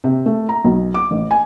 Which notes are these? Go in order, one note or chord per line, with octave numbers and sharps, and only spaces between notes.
C3
A3
A#5
B1
D6
A1
G#5